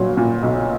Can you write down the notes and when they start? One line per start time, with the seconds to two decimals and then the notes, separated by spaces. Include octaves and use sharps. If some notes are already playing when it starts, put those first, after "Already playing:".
Already playing: G1 A#2 F#3
0.17 A#2
0.43 B1